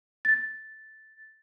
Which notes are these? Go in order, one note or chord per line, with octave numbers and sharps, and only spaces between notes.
A6